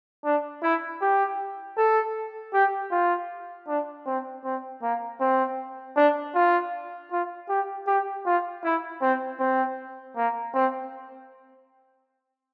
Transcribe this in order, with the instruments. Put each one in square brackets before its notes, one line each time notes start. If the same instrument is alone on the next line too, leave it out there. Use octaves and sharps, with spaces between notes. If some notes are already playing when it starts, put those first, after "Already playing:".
[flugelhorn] D4
E4
G4
A4
G4
F4
D4
C4
C4
A#3
C4
D4
F4
F4
G4
G4
F4
E4
C4
C4
A#3
C4